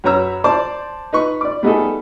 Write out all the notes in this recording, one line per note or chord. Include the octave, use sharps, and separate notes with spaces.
F#2 B4 C#5 A#5 E6
C5 D5 A5 D6
D#4 B4 C#6
D5 D6
G3 A3 B3 D#4 G#4 A4